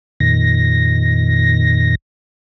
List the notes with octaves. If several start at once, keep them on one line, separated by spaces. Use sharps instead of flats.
F2 A#2 D#3 A#6